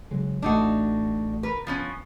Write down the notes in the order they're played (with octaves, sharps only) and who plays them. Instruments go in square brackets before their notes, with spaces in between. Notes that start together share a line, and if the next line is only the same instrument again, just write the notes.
[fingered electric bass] C#3 F#3 G#3
[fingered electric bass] A1 A3 [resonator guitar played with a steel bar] D4 D#4 F#4
[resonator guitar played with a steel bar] A#4 B4
F3 B3 C#4